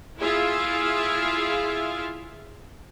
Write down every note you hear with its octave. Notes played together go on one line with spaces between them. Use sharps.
E4 F4 G#4 E5 F5